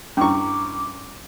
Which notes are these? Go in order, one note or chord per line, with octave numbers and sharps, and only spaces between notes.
G2 C#4 E4 C#6 D6